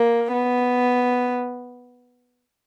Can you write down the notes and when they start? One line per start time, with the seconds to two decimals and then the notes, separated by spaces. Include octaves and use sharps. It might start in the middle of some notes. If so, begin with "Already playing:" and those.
Already playing: A#3
0.32 B3